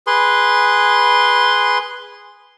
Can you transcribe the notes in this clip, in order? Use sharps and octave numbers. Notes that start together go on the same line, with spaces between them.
G#4 B4 C6